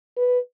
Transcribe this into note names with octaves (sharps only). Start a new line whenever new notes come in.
B4